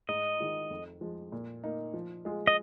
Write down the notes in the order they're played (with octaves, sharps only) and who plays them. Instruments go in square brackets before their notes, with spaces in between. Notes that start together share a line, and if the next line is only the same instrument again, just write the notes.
[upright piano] G#2 [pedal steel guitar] D#5
[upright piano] D#3 G#3 F4
F2
F3 G#3
A#2
A#3 D#4
F3
G#3 F4 G#4
[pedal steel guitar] D#5